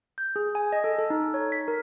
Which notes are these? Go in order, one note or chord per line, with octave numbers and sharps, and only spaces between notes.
G6
G#4
G#5
D#5
A4
A4
D#4
C#5
B6
A#4